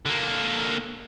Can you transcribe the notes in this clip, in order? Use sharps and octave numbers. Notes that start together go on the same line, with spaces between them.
D3 A#3